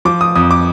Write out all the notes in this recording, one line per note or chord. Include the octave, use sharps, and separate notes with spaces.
F3 D6
D#6
F2 D#6
D6